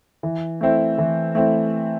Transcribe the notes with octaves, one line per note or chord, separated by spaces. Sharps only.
E3
A3 C4 E4
E3
A3 C4 E4